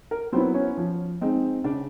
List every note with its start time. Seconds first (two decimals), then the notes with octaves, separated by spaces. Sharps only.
0.11 A#4
0.32 F#3 B3 C4 E4 C5
0.54 C#4 C#5
0.77 F3
1.21 G#3 C4 D#4
1.64 C#3 D4 D5